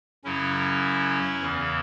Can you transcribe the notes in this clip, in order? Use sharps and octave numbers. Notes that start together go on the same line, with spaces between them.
F#2 C#3 F#3 C#4 E4
E2 C#3 E3